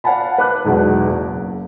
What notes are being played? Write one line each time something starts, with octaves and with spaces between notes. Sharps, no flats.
D5 F5 F#5 G#5 A5 B5
B4 D6 F#6
B1 E2 B2 G#3
F#1